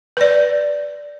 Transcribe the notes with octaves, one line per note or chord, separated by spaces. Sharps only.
B4 D5